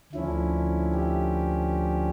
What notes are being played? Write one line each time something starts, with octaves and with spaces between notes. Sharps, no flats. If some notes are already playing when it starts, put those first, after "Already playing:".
D2 D3 F3 C#4 E4
G4